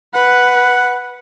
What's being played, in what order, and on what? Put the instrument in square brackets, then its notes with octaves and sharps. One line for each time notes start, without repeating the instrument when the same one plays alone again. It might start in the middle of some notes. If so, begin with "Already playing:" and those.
[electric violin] B4 [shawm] F#5